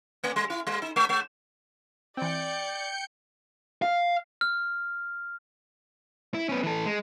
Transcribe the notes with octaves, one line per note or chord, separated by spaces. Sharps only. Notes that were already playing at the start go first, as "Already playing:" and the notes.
A3
G3
E4
G3
D#4
G#3
G#3
E3 C4 D5 G5 G6 C#7
F5
F6
E4
B3 C#4
E3 A4
G#3